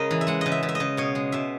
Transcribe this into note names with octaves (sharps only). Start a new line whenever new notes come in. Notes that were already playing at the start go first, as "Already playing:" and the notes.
Already playing: C#3 G#3 A#4 D#5
E3
E5
G#3 F#5
C#3 D#5
E5
C#3
E5
D#5
C#3
B2 C#5
G#3
B2 E5